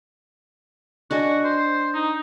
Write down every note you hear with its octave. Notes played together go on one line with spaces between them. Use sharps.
D4 F#4 D#5 G#5
C5
D#4